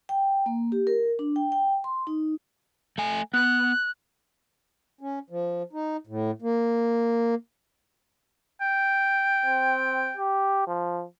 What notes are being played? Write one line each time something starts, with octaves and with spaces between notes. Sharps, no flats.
G5
A#3
G4
A#4
D4
G5
G5
C6
D#4
A3 G#5
B3 F#6
C#4
F3
D#4
A2
A#3
G5
C4
G4
F3